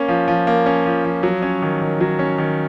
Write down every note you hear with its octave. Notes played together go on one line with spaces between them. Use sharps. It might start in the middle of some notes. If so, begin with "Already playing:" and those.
Already playing: A#3 C#4
F3
F3
A#3
C#4
F3
F3
F#3
C#4
D#3
D#3
F#3
C#4
D#3